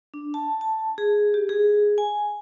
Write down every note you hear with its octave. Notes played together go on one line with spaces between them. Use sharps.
D4
A5
A5
G#4
G4
G#4
G#5